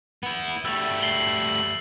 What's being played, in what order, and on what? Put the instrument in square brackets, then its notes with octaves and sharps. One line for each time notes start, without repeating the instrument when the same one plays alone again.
[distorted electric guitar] B3 E4
[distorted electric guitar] G3 A3 [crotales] E6
[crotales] C7 F#7 G7